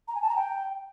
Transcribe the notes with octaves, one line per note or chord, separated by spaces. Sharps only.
A#5
G#5
A5
A#5
G5